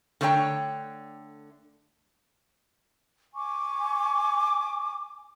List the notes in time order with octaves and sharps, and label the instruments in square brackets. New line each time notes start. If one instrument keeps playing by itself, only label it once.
[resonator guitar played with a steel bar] D3 A3 D4 C#5 G5 A#5
[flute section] G#5 C#6 D6